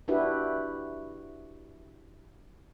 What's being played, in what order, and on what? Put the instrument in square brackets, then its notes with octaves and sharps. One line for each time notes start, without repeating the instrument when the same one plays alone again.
[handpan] D4 E4 F#4 G4 B4